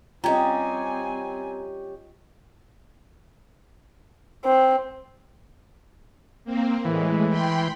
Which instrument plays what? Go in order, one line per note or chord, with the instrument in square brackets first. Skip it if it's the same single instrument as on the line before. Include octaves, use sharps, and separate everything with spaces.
[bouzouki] G3 C#4 [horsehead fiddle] C4 G#5 [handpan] F4 D#5 [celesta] A#5 G#6
[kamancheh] C4
[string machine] A#3 C4
[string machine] A2 G#3 [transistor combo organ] E3
[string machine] G5 B5 C6